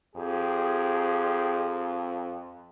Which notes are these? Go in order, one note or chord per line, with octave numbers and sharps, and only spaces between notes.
F2 G4 G#4